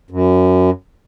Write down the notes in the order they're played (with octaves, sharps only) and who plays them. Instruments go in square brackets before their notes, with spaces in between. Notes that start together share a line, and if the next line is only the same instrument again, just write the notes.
[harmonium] F#2